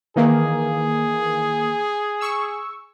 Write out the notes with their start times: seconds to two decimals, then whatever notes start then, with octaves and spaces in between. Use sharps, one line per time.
0.16 D#3 E3 A#3 G#4
2.21 C#6 E6